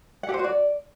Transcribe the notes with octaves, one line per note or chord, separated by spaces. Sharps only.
F#5
G4
C5
F#4
D5